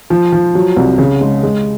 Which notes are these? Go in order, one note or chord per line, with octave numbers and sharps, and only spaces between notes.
F3
F3
F#3
C2
C#3
G#3
G#3